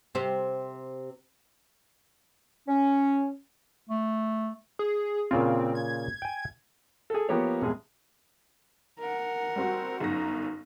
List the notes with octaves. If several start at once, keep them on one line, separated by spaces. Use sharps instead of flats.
C3 C4
C#4
A3
G#4
A#2 C#3 C4 F4
G#6
G5 G#5
G#4 A4
F3 A#3 B3 G4 C#5
A#1 E2 G#3 G#4
A#4 F#5
G3 C4 F#4
G1 F#2 D#4 A#6